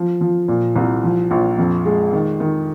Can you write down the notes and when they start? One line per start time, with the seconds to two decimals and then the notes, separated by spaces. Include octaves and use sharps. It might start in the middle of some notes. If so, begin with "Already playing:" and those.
Already playing: F3
0.21 F3
0.48 A#2
0.76 C2
1.04 F3
1.31 A#1
1.58 F2
1.85 G#3
2.13 D#3
2.40 D#3